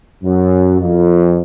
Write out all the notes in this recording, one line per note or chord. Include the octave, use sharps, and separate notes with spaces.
F#2
F2